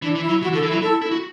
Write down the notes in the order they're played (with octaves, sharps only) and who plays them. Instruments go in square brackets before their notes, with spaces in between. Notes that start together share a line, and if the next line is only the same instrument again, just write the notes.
[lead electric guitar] E3 [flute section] D4
[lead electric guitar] E3
[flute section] E4
[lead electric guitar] F#3
[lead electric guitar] E3 [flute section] F#4
[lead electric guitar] D3 [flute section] A4
[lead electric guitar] E3
[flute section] E4
[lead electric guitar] F#3
[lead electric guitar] E4 [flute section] A4
[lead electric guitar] E4
F#4